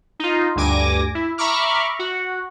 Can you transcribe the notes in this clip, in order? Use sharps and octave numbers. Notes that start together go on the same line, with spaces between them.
D#4 F4
D2 G2 G#5 D6 A#6
E4
E5 A#5 B5 C#6 D6 F6
F#4